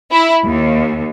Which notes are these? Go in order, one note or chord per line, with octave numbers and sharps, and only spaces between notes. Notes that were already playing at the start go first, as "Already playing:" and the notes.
E4
D#2